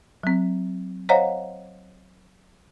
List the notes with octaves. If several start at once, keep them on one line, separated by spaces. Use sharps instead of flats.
F#3 C4
C5 C#5 D#5 F5 F#5 A#5